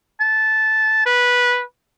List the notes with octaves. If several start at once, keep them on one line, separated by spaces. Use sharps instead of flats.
A5
B4